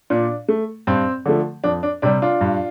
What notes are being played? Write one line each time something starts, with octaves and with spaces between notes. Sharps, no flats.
A#2 D4
A3
G2 C4
D3 F3 A3
F2 D4
D4
C3 G3 D4
D4 F4
G2